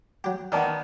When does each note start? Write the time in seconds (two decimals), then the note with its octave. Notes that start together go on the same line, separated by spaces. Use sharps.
0.24 F#3 G4
0.52 D#3 A#3 B3 D5 A5